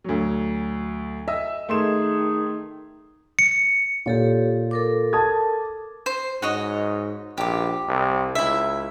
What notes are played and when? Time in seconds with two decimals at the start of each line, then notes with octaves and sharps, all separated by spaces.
0.04 D2 F#3
1.28 D#5 E5 E6
1.69 D#3 A3 G#4 C6 E7
3.39 C#7
4.06 A#2 G4 A4 C#5
4.71 A4 A#4 D6
5.13 A5 D#6 G#6
6.06 C5
6.42 G#2 F#4 C#5 D#5
7.38 A#1 G4 D6
7.88 C2
8.35 C#2 E4 E5